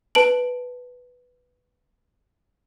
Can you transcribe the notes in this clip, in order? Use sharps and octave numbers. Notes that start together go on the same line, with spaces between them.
B4 A5 D7 F#7